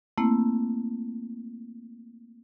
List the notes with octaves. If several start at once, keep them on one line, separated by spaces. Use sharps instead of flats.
A3 A#3 C4 E4